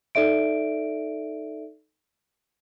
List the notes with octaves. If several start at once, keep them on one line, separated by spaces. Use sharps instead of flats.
D#4 A4 D5 E5 D7